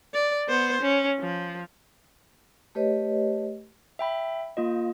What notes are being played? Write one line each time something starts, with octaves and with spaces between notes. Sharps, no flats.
D5
B3 C5
C#4
F3
A3 G4 B4 C#5 D#5
E5 G5 B5
A#3 F4 D#5